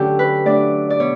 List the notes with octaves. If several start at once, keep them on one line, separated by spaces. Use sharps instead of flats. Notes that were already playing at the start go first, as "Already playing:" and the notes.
Already playing: D3 F#3 A3 C#4 G4 A4
B4
F#3 A3 D4 D5
D5
B2 C#5